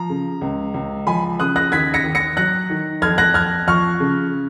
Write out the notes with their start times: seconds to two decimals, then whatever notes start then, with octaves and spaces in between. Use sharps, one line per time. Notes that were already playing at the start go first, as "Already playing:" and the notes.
Already playing: F3 A#5
0.10 C#3
0.41 C#2
0.74 C#2
1.07 F3 G#5 B5
1.40 C#3 D#6 F#6
1.56 F#6 A#6
1.72 D#2 G#6 B6
1.94 A#6 C#7
2.04 D#2
2.15 A#6 C#7
2.37 F#3 F#6 A#6
2.70 D#3
3.02 F2 F6 G#6
3.18 F#6 A#6
3.34 F2 F6 G#6
3.67 F3 C#6 F6
4.00 C#3